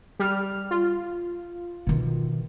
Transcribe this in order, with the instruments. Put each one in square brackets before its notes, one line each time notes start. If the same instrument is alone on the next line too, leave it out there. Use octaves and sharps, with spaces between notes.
[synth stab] G3 F6
F4
[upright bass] B2 D#3